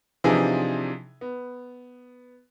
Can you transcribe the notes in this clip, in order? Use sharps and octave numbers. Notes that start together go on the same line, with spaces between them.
C3 E3 F3 D4 D#4 G#4
B3